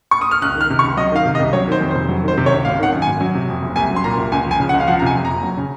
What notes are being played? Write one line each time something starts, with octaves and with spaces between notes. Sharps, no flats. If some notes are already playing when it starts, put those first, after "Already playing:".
C#6
D#6
F6
C#2 F#6
D#3
F6
C3
C#6
C#2
F#3 D#5
D#3 F5
C3
D#5
C2
F#3 C#5
D#3 C5
F2
C5
F1
F#3
D#3
C5
C3
C#5
C#2
G#1 F5
D#3 F#5
F#2
G#1 G#5
F#3
C3
F2
F#1
C2 G#5
F#3
C6
A#2 A#5
C2
C#2 G#5
F3 G#5
C#3
F#5
C#2
F5
F3 F#5
A#5
C3 G#5
F2
F#1 A#5
F#3
C#3